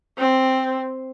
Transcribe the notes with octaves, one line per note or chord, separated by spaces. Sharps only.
C4